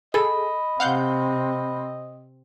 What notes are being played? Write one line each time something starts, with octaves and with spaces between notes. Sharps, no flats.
G#4 A4 D#5 B5
C3 C4 F5 F#5 G6